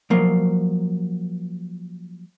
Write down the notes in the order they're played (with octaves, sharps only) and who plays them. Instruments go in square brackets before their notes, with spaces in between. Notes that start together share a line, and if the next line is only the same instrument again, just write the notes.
[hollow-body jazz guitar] F3 F#3 A#3